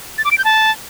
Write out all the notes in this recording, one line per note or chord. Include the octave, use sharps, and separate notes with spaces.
A6
D6
D7
G6
A5